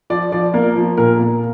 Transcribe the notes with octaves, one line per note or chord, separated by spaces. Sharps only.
F3 D5
F3 D5
A#3 A#4
F3
A#2 A#4
A#3